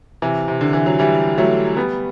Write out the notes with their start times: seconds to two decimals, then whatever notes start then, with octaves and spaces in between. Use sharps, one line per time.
0.22 C3 E3
0.48 C3
0.61 D3
0.73 E3
0.86 F#3
0.99 E3 G3
1.38 F#3 A3
1.76 G3 B3